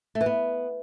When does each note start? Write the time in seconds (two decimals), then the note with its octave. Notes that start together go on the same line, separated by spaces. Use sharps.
0.15 A3
0.21 E3
0.26 B3